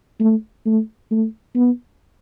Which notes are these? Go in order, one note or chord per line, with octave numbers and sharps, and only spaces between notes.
A3
A3
A3
B3